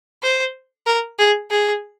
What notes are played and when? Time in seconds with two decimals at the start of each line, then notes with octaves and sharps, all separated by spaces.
0.23 C5
0.86 A#4
1.19 G#4
1.51 G#4